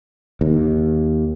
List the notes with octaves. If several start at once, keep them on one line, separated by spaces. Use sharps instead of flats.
D#2